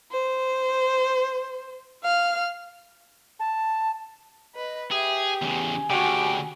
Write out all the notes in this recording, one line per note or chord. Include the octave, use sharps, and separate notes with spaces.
C5
F5 F6
A5
B4 D#5
G4 G#4 E5
E2 C#3 G#5
D2 C#3 F#4 G4